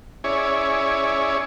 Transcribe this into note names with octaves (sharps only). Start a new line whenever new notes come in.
C#4 E4 G#4 C#5 D5